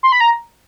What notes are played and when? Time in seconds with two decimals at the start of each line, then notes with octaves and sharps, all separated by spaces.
0.03 C6
0.12 B5
0.21 A#5